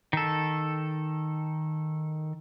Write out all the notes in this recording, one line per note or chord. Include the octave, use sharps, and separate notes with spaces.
D#3 A4